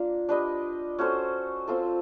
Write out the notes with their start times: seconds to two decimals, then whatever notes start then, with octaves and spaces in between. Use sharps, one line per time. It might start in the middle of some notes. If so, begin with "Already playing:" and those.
Already playing: A#3 D4 F4
0.29 D4 G4 B4 D#5
0.99 C#4 F#4 A4 C5
1.68 C4 F4 A4